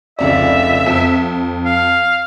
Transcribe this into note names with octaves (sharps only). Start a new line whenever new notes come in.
F1 C#2 D5 E5
F2
F5